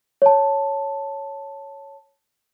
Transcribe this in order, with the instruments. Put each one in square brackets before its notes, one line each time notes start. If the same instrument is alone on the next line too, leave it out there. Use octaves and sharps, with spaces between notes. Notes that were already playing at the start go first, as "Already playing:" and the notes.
[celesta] C#5 A5